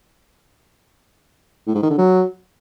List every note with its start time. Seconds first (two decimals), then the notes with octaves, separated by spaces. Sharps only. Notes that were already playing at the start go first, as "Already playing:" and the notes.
1.67 A2
1.75 G#2
1.83 D#3
1.90 D3
1.98 F#3